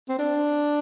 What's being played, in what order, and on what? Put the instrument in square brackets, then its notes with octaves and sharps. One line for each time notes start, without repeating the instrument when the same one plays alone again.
[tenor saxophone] C4
D4